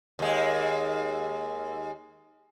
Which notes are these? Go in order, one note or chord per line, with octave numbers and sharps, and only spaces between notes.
D#2 G#3